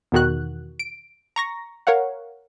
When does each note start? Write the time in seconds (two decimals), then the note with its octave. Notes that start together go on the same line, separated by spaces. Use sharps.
0.12 E2 B2 D#3 F#4 F#6
0.79 D7
1.36 A#5 C#6 A#6
1.87 A#4 C#5 F5 F#5